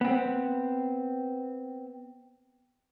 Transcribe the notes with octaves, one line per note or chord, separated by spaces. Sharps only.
B3 C4